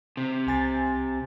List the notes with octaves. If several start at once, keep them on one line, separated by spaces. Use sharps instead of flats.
C3
C2 G#5 A6